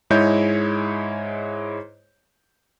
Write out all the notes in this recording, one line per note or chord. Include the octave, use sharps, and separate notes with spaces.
G#2 G#3 E4 C#5 D#5 G6